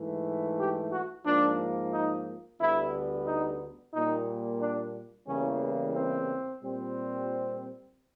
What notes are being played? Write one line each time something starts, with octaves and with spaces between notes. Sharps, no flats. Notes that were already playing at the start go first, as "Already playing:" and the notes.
Already playing: G#2 E3 A3
G4
F#4
G#2 F3 A#3 D4
D#4
D2 D3 G3 B3 E4
D#4
A#2 G3 A#3 D#4
D4
E2 C#3 E3 G3 A#3 C#4
C4
A#2 G3 C4